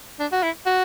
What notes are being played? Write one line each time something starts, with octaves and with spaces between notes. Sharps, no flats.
D4
F#4
E4
F#4